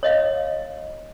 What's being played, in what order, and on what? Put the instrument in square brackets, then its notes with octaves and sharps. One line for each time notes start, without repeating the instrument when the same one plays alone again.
[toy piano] C#5 D#5 F5